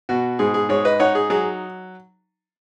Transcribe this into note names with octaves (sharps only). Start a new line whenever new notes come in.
B2 F#4
G#2 G#4
G#4
G#2 G#4 C#5
B4 D#5
D#4 C#5 F#5
G#4
F#3 G#4